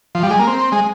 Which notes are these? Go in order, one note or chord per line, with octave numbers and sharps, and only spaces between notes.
F3
G3
G#3
A#3
C4
G#3